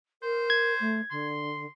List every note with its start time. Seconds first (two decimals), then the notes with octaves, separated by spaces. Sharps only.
0.22 A#4 C5
0.50 G#6
0.80 A3
1.11 D3 C6